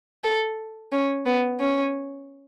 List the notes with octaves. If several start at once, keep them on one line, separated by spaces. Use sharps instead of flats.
A4
C#4
B3
C#4